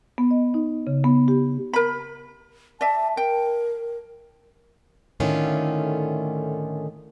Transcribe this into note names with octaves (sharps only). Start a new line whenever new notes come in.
B3
D#5
D#4
C#3
B3
G4
A#4 B5
D5 E5 A5
A#4 G5
A2 D3 D#3 A3 C#4 F4